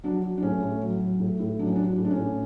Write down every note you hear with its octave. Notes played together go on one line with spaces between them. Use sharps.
F#3 D4
F#3
D4
A2 C#4
A2
F#3
F#3
A2
A2
F#3 D4
C#4
D4
F#3
F#4
A2
D4
C#4
A2